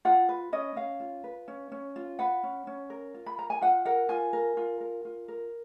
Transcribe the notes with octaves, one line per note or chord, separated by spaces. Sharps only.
F4 F#5
B4
C#4 D#5
C#4 F5
F4
B4
C#4
C#4
F4
B4 F#5
C#4
C#4
A#4
F4
B5
A#4 A#5
G#5
F4 F#5
A#4 F#5
F4 G#5
A#4
F4
A#4
F4
A#4